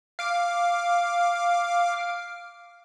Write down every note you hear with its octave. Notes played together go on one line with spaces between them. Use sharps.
F5 D6